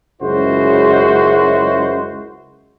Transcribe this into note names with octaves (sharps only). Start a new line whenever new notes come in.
C#2 F#2 G#3 E4 F#4 C5